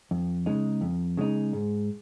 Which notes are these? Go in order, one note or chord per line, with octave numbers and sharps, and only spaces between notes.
F2
C#3 G#3 D#4
F2
C#3 G#3 D#4
G#2